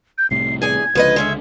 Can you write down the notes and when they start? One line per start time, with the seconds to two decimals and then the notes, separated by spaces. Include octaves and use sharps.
0.18 G6
0.31 C2 A2 C3 C7
0.62 E2 G#4 G#5 G#6
0.95 C#2 D3 F3 B4 D#5
1.16 G#3 C#4 E5